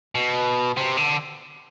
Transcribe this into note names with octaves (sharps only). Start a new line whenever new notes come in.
B2
C3
D3